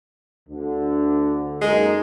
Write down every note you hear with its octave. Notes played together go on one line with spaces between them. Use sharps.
D2 D3
F#2 G#3 A#3 D#4